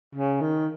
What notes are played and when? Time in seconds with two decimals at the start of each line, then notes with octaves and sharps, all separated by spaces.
0.15 C#3
0.41 D#3